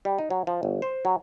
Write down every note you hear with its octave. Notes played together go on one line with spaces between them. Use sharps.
G3
D#4
F#3
F3
G1
C5
F#3